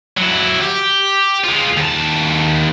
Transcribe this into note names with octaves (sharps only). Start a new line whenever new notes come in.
F#3 E4
G4
G#3 F4
D#2 A5